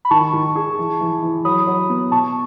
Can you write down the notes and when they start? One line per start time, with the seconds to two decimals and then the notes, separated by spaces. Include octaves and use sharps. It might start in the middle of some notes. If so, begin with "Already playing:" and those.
0.05 B5
0.11 D#3 A5 C#6
0.33 D#3
0.55 G#4
0.78 E3
1.01 E3
1.22 E3
1.45 F#3 B5 D#6
1.67 F#3
1.90 B3
2.11 B2 A5 C#6